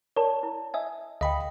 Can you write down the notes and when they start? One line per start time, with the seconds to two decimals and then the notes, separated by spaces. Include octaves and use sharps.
0.16 A#4 C#5 D5 A5
0.43 E4
0.74 D#5 E5 G#5
1.21 D2 D#5 F5 G5 B5